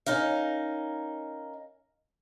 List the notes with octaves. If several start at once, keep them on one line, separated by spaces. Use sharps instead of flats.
C#4 D#4 A#4 F5